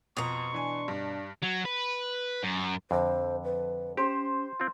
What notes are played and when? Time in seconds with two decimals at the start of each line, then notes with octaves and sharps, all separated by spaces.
0.17 F2 B2 A#5 C6 C#6 D#6 F7
0.54 E3 D4 G#5
0.88 G2
1.42 F#3
1.65 B4
2.43 F#2
2.91 F2 D3 C5
3.44 B4
3.97 C#4 G4 C5
4.60 C4 F4